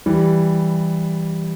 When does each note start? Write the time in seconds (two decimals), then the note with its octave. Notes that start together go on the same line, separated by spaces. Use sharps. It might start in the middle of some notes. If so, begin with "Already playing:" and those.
0.06 E3 G3